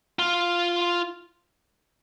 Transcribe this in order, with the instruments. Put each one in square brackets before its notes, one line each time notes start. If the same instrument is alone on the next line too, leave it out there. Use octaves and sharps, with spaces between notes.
[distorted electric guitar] F4